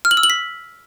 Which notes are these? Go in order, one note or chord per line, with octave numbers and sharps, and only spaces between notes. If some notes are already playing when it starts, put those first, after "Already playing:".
F6
F#7
E6
F#7
B6